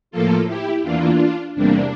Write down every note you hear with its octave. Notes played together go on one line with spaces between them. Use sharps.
A2 F3 A#3 F4 A4
E4 G4
E2 E3 A#3 D4 F4
E2 C3 G3 A#3 D4